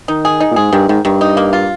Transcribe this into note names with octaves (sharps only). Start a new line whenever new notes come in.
D#3 D#4
G#4
D#4
A#2
G#2 G#4
G2 D#3
G#2 D#3
G2 D#3
D#4
A#3
F4